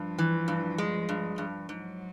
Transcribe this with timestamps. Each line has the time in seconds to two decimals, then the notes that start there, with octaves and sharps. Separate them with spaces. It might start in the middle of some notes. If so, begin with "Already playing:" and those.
Already playing: G2 F3
0.19 E3
0.48 G2
0.78 G#3
1.09 G2
1.38 G2
1.68 G#2 F#3